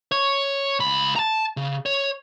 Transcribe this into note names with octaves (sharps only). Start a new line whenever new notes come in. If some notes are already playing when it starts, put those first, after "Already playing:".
C#5
C#2 B5
A5 A#5
C#3
C#5